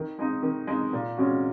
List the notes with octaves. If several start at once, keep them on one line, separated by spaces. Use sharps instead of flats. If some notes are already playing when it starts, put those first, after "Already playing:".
Already playing: D#3
G#3 D#4
D#3
G#3 D#4
A#2
G#3 C#4 F#4